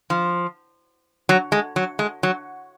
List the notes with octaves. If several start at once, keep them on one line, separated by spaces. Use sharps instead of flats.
F3
F#3
G#3
F#3
G#3
F#3